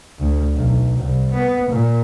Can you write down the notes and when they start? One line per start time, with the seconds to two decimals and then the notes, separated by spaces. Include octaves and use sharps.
0.19 D2
0.54 B1
0.99 C2
1.33 B3
1.70 A#2